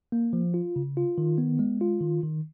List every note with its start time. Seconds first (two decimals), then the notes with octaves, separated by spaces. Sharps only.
0.12 A#3
0.33 F3
0.54 F4
0.76 C#3
0.97 F4
1.18 D#3
1.38 B3
1.59 G#3
1.81 F4
2.01 D#3
2.23 D#3